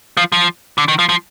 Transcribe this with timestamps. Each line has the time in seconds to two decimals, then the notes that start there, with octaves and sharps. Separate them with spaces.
0.17 F3
0.32 F3
0.78 D3
0.88 D#3
0.99 F3
1.09 F3